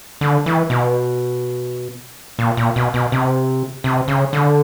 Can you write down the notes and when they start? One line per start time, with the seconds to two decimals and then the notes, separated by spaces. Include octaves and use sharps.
0.21 D3
0.46 E3
0.70 B2
2.39 A#2
2.57 A#2
2.76 B2
2.94 B2
3.12 C3
3.84 C3
4.08 C#3
4.33 D3